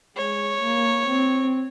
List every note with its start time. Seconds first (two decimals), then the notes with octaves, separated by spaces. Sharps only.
0.17 G#3 C#5
0.62 A#3
1.07 C4